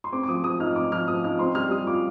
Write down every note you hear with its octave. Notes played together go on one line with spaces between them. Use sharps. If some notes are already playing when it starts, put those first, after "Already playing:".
C6
C4 D6
D6
F3 D#6
F3 D#6
D#4 F6
C4 D6
F3 F6
F3 D#6
D#4 F6
C4 C6
G3 F6
G3 D#6
F4 D6